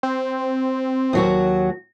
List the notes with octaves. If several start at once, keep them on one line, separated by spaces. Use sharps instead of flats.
C4
D#2 F#3 F#4